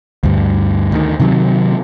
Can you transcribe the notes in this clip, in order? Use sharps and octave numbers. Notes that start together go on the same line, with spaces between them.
D2 G2
D2 D#3
C3 D#3 F3 F#3